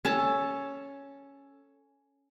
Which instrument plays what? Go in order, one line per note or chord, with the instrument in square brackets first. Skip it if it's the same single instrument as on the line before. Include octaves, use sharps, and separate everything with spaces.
[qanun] C#4 A4 A5